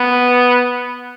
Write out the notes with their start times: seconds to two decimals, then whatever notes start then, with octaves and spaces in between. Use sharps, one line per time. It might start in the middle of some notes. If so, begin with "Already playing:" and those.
Already playing: B3